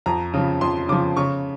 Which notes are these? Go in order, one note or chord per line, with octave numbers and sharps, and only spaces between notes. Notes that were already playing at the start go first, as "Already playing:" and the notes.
F2 A#5
C#3 F3
F2 C6
C#3 F3 D6
C#3 C#6